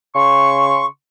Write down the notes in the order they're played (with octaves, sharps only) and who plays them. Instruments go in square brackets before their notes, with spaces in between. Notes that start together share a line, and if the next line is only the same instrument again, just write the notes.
[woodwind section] C#3 C6 C#6